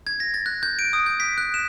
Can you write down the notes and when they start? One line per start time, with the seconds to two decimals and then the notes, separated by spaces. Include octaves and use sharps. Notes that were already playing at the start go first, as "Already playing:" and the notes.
0.07 G#6
0.20 A#6
0.34 A6
0.46 F#6
0.63 G6
0.79 D7
0.93 D#6
1.06 G6
1.20 B6
1.38 F#6
1.54 E7